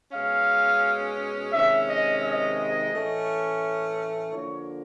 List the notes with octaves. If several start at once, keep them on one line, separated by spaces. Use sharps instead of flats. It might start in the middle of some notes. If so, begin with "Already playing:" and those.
B2 G#3 C#4 F5
C3 D#3 G#3 C#4 E5
D#5
D#5
A2 E3 A3 C#4
D3 F3 A#3 C#5